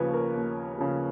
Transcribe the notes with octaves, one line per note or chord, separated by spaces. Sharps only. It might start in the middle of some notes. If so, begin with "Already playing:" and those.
Already playing: D#2 C#3 F3 B4 C#5
A#4
D#2
C#3 F3